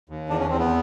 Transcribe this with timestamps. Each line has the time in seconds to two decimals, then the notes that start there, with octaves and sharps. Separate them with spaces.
0.09 D#2
0.30 E2 D4
0.40 C#4
0.49 E2 C4
0.59 B3